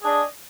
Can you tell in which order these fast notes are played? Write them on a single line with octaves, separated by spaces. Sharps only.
G#4 D4 D#5